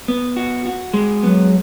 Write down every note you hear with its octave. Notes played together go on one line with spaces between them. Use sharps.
B3
F#4
F#4
G#3
F#3 B3